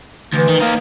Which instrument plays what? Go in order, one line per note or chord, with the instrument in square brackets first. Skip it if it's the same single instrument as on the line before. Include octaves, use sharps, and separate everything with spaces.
[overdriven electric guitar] D2 [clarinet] E3
[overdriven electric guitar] D#3
[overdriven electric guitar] A#3 D#4 [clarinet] F5